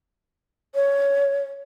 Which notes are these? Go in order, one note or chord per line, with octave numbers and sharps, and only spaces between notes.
C#5